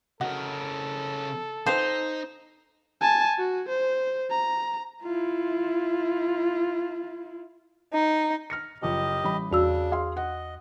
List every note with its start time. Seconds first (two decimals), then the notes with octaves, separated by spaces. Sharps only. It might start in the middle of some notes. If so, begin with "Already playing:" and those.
0.21 C#3 F#4 A4 A#4 D#5 F#5
1.66 F3 C4 D#4 B4 C5
3.01 G#5 A5
3.39 F#4
3.69 C5
4.31 A#5
5.03 E4 F4
7.94 D#4
8.50 F6 A#6 C#7
8.82 F#1 F3 G4 D#5
9.24 A1 G3 B5
9.51 E2 C#3 D4 F#4 E6
9.92 G#4 F5 C6
10.17 D#5 F#5